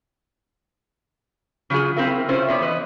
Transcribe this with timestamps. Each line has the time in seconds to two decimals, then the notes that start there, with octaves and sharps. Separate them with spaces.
1.70 C#3 F#3 C#4 F4 G#4
1.96 C4 E4 A#4 F5
2.28 C3 C#4 E4 F4 C5
2.48 C3 B3 C#5 D5
2.61 E3 B4 D5 D#5